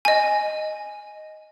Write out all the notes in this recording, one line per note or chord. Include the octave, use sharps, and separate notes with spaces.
D#5 G#5